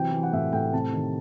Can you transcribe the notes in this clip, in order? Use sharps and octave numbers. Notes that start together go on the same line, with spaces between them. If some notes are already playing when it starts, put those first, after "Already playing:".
Already playing: C3 E3 F#3 G5
E3
F#5
A2 E5
A2 G5
C3 A5
D#3